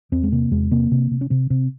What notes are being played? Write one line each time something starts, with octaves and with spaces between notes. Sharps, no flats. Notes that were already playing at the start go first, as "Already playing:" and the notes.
E2 C4
G#3
C3 A#3
E2 G#3
C3 A#3
C3
C3
C#4
C3 C4
C3 C4